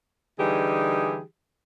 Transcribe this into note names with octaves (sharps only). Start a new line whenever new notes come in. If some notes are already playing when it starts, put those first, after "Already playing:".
D3 E3 G3 D#4 G4 G#4